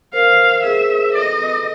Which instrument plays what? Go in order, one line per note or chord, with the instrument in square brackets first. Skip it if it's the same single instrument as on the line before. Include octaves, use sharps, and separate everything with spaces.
[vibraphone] A#4 C5 [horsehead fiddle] F5
[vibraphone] G#4 A#4 [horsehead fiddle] E5
[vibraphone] A4 B4 [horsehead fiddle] D#5